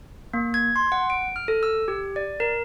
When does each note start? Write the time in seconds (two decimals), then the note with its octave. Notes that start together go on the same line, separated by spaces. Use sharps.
0.34 A#3
0.54 G#6
0.76 C6
0.92 F#5
1.10 D7
1.36 F6
1.48 A4
1.63 E6
1.88 G4
2.16 D5
2.40 A#4